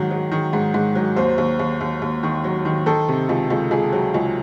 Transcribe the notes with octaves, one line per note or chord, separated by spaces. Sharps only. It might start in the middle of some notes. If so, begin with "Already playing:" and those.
Already playing: G#2 D#3 F#3
F#3
D#3
G#2
G#2
F#3
D#2 C5
D#2
D#2
D#2
D#2
D#3
F#3
D#3
D#3 A4
C3
C#2
C#2
C#2 G#4
F#3
C#2